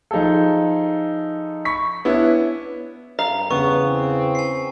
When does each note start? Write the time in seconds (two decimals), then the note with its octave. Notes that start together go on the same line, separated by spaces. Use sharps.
0.11 F3 D#4 G#4 A4
1.65 B5 C#6 B6
2.05 B3 C#4 D4 E4
3.19 G2 F5 A#5
3.51 E2 G2 C#3 B3 C#6
3.85 C4
4.35 G#5 C7